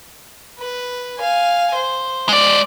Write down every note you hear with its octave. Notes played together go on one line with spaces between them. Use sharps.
B4
F5 G#5
C5
G#3 D5